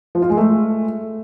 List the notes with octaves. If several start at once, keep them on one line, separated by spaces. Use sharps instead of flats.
F3
F4
G#3
A3